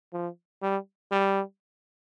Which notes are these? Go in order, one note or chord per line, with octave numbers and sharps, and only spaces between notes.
F3
G3
G3